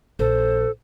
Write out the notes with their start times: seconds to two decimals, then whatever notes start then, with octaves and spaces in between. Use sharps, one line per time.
0.19 A#1 A4 C5